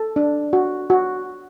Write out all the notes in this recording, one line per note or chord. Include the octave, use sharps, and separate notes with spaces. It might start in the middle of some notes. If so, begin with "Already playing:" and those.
Already playing: A4
D4
F#4
F#4